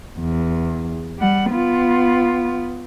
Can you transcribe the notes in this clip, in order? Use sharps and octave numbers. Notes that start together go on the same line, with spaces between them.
E2
G3 F#5
B3 F4